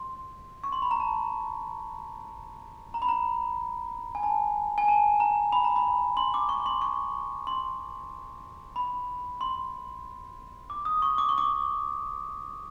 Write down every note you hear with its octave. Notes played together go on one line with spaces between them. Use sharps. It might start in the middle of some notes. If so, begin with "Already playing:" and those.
Already playing: C6
C#6
C6
B5
A#5
A5
A#5
B5
A#5
G#5
A5
G#5
A5
A#5
B5
A#5
B5
C6
D6
C#6
C6
C#6
C6
B5
C6
D6
D#6
C#6
D6
C#6
D6